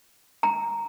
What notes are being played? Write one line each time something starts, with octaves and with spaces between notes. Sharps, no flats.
A#5